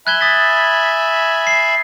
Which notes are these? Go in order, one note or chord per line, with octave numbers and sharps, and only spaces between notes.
E5 G#5 B5 F#6 G#6 G7
D#6 A6 B6
C7